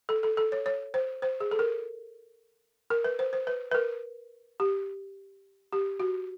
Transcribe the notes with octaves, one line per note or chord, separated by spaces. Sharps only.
A4
A4
A4
C#5
C#5
C5
C5
G#4
A4
A#4
A#4
B4
C5
C5
B4
B4
A#4
G4
G4
F#4